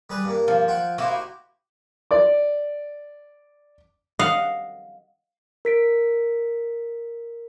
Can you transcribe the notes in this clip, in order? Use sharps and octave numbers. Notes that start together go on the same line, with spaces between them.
G3 G#4 B4
G2 A#3
F3
F#5 G5 C6
A#3 D#4 E4 F#4 G4 C5
D5 D6
D#5 F5 F#5
A#4 B6 D7